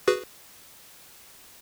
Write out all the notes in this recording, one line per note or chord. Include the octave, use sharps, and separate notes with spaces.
F#4 G#4 B4